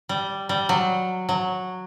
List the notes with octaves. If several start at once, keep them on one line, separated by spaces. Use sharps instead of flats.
G3
G3
F#3
F#3